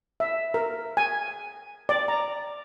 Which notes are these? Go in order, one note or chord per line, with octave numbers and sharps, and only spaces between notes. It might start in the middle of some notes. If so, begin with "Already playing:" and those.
E5
A#4
G#5
D5
A#5